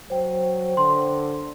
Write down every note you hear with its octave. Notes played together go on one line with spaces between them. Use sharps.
F#3 C5 G5
D3 C6